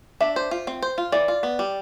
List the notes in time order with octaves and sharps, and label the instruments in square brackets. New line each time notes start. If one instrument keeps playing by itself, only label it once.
[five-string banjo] D4 [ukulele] E5
[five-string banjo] C5
F4
C4
C5
F4
[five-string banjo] E3 [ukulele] D5
[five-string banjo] F4
B3
G3